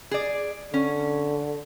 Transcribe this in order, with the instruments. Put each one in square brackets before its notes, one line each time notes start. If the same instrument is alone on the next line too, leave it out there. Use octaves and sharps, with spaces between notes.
[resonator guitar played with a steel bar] G#4 D5
[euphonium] D3 [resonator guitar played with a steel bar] C#4